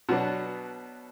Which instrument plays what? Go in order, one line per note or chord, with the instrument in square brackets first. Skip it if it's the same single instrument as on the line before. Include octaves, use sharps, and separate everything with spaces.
[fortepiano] B2 F#3 B3 D4